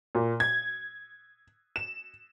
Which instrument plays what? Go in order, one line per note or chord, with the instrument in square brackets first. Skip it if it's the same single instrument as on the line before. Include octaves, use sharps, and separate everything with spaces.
[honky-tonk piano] A#2
G#6
E7